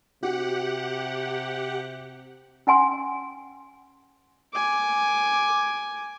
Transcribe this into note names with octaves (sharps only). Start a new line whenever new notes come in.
C3 F#4 G4 F#5
C#4 F#5 G#5 C6
G#5 D6